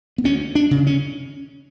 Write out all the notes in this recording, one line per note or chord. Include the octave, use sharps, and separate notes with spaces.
B3
D2 C#4
D4
C#3
C#4